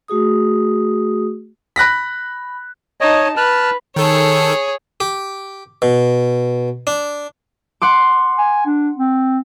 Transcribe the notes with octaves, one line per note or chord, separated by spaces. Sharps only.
A3 F#4 G#4 D#6
B5 F#6 A#6 B6
D#4 C#5 D#5 A5
B4 A5 F6 F#6
D#3 G#4 A4 C#5
G4
B2
D4
F#5 C6 D6
G#5
D4
C4